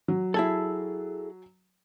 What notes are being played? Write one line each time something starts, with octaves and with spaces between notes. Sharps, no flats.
F#3
E4 G#4 A4